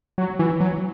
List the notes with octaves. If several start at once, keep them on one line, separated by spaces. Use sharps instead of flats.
F#3
E3
F#3